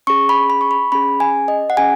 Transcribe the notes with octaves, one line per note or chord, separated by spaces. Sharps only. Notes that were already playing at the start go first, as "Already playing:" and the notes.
C#4 G#4 C#6
B5
B5
C#6
B5
C#4 G#4 B5
G#5
D#5
F#5
C#4 G#4 G#5